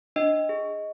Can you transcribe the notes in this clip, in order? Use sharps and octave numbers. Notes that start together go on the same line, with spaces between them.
D4 D#5
G#4